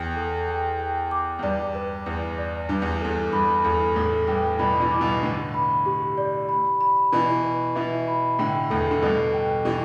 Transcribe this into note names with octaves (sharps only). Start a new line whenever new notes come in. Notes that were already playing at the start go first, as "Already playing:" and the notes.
Already playing: E2 G5
A4
G5
G5
D6
E2
G2 D5
B4
E2 B4
D5
G2 D4
E2
E2 A4
G2 B5
E2 A4
E2 A2 A4
G2 G5
G2 B2 B5
B2 E3
D6
G2 B2
A2 D3 B4
B5
G4
D5
B5
B5
B2 E3 B4
B4
B2 E3 E5
B5
A2 D3 G5
E2 A2 A4
D3
G2 B2 A4
G5
B2 E3 G4